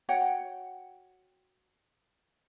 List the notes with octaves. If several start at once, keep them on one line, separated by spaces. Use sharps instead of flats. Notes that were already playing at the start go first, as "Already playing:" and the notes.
F#4 C#5 F#5 G5